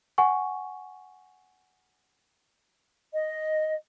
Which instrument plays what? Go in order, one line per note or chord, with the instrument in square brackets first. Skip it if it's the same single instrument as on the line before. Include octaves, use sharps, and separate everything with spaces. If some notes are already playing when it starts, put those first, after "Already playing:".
[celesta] F#5 G#5 C#6
[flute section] D#5